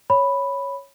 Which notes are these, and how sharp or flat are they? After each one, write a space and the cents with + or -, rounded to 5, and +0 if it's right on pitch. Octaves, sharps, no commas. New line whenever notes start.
C#5 +0 B5 +0